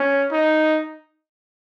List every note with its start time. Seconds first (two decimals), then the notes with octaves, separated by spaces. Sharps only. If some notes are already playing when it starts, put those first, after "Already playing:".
Already playing: C#4
0.31 D#4